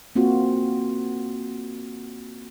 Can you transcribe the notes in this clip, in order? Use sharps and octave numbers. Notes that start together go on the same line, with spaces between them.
A#3 C4 F4 F#4